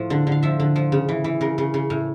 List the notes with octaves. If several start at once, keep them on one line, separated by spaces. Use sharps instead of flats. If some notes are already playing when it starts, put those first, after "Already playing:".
Already playing: A2 F3
D3
D3
F5
F3 E5
D3
F3
C#3
E3
E3
C#3 A#4
C#3
C#3
A2